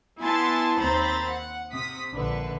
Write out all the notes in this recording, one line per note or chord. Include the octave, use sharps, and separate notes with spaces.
B3 E4 G#5 A5 C6 A6
D#2 C4 C5 A#5 B5 A6
F#5
C3 D#6 B6
A#1 D3 B4